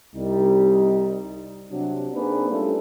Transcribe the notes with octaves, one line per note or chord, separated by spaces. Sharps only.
C2 G3 D#4
C3 F#3 D4
A#3 C4 D4 D#4 G#4 B4
G3 A3 C#4 D4 F4 A4